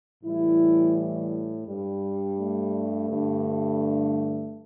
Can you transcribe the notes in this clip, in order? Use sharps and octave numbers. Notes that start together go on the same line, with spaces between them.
A2 E3 G3 E4
G2 G3
A3
G2 D3 G3